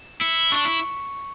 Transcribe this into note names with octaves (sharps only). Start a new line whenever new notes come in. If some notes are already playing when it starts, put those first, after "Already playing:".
Already playing: E7
E4 C#7
D4 C#6
E4